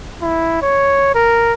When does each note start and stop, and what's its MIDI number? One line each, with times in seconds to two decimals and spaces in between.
0.22 0.62 64
0.62 1.13 73
1.15 1.53 70